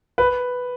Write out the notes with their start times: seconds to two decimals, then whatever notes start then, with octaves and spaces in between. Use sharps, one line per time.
0.18 B4